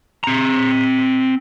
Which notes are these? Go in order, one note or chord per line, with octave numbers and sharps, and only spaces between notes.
C4 A#5